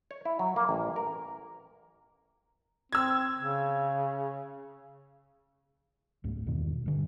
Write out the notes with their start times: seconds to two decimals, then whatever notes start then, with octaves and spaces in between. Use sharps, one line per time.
0.11 C#5
0.25 E4
0.39 F#3
0.56 A#3
0.69 A1
0.96 A#4
2.93 C4 E6 G#6
3.38 C#3
6.24 C#2 G#2 A3
6.46 E2 B2 D#3
6.86 G2 D3